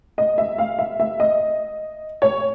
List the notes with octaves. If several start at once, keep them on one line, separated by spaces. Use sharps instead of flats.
D#5
E5
F5
E5
E5
D#5
C#5